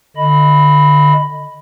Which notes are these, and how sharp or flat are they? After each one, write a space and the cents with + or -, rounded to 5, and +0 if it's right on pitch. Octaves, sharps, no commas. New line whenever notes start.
D3 +20 D#5 +0 B5 +5